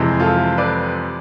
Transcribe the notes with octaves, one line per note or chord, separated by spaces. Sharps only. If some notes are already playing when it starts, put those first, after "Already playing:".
Already playing: F2 C3 E3 G#3
F4 A4
B4 D5